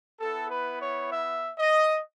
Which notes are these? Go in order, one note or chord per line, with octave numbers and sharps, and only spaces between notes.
B3 E4 A4
B4
C#5
E5
D#5